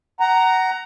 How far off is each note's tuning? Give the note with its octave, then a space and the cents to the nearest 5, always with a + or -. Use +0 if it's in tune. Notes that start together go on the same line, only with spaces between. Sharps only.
F#5 +20 A#5 +0